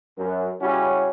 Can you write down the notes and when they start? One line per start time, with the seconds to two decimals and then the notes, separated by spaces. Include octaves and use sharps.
0.18 F#2
0.61 C#3 G3 C#4 E4 F#4